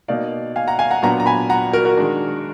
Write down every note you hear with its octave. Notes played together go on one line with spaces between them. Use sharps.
B2 A#3 D#4 D5 F5
F5 G#5
F#5 A#5
F5 G#5
F#5 A#5
A#2 F#3 B3 D4 F#5 A#5
A#5
G#5 B5
F#5 A#5
F#4 A#4
F#4 A#4
D#3 G#3 D4